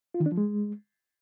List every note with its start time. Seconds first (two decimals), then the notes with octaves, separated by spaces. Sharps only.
0.14 F4
0.20 D#3
0.26 D4
0.32 F3
0.37 G#3